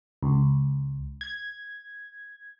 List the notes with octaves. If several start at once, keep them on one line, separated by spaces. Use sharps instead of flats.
C#2
G#6